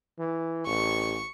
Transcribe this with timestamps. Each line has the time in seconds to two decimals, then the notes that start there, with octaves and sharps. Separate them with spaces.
0.19 E3
0.67 A1 C#6